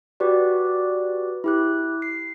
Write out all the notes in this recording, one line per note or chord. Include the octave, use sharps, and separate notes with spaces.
F#4 G4 B4 D5
E4 G4 F#6
C7